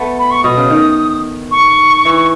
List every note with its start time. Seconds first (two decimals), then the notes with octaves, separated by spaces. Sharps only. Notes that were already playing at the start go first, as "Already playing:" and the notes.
Already playing: A3 B3
0.18 B5
0.31 C#6
0.44 B2 D#6
0.57 C#3
0.70 D#3
1.51 C#6
2.05 E3